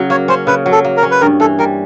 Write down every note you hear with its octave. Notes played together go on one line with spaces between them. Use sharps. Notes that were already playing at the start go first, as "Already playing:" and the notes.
Already playing: C#3 F#3
A#3 C#5
C#4 C5
C#3 B4
F#3
A4
A#3
A#4
C#4
B4
G2 A#4
E3 A4
G3 A#4